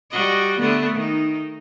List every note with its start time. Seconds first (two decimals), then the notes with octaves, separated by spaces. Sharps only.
0.11 G3 F#4 D#5
0.59 D3 A3 B3
0.96 D#3 D#4